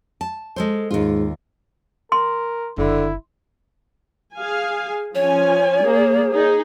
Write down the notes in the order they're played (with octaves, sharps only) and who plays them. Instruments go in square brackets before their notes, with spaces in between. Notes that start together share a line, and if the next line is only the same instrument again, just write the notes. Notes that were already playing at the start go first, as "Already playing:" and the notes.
[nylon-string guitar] A5
G#3 A4 C5
[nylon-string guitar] D#2 F4 [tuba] G#2
[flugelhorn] A#4 [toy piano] C6
[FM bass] F#1 [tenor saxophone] D3 [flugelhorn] E4
[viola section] G#4 F5 G#5
[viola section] F3 C#4 G#5 [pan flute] C#5
[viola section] A#3 G#4
D#4 G#4